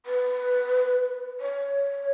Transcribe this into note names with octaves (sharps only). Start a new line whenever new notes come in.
B4
C#5